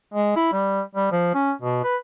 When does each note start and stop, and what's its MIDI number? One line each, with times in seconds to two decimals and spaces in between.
0.14 0.33 56
0.36 0.49 64
0.53 0.81 55
0.95 1.09 55
1.12 1.31 53
1.34 1.52 61
1.62 1.82 47
1.84 1.96 71